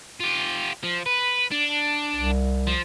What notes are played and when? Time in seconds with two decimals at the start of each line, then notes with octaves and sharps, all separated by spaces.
0.20 F4 G4
0.83 F3
1.06 B4
1.52 D4
2.16 C2
2.67 F3